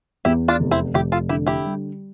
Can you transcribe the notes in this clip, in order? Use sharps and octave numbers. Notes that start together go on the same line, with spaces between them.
E2 E4 G4
D4 F4
F1
C4 E4
F1 E4 G4
F4 A4
D3 E4 G4
E4 G4
G3